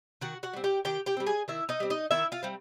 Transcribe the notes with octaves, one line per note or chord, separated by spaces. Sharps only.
D#3 F#4 F#5
F#4 F#5
G3 C4
G4 G5
D#3 G4 G5
G4 G5
G3 C4
G#4 G#5
D#3 E4 E5
D#4 D#5
G3 C4
D#4 D#5
D#3 E4 E5
F4 F5
G3 C4